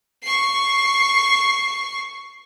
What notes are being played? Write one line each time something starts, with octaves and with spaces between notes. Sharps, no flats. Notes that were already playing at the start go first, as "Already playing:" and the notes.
C#6 C7